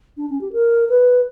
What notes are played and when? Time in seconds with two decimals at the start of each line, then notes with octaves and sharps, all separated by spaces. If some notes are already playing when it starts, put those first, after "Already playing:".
0.17 D4
0.30 C#4
0.41 G4
0.53 A#4
0.89 B4